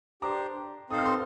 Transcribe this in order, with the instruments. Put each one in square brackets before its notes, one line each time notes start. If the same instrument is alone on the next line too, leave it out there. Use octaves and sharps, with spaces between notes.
[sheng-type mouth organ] D4 G4 C5 [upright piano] A#5 D6
[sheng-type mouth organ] C4 D#4 A4 C5 F5 [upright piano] D#6
[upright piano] F6
C6 D#6